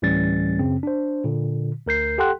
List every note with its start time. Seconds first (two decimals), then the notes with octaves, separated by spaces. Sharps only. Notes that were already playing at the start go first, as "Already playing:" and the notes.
0.02 D2 A2 E3 G3 C#4 A6
0.59 F#2 C#3 C4
0.83 D4 C5
1.24 A#2 D3
1.86 D2 A#4 G6 C7
2.18 G4 A4 F#5 G5 C6 F#6